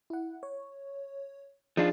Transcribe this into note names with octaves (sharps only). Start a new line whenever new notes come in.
E4 F#5
C#5
F3 D4 D#4 F4 G#4